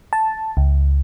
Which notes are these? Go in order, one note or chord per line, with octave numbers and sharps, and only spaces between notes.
A5
C#2